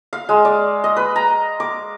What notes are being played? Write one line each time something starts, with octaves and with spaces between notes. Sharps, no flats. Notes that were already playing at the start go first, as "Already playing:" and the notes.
F5
G#3
D5
D#5
B4
A#5
D6